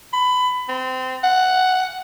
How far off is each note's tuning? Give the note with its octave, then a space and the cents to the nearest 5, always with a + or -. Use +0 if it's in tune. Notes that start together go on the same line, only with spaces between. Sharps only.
B5 +20
C4 -25
F#5 +5